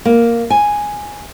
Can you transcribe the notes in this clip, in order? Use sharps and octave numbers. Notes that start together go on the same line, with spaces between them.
A#3
G#5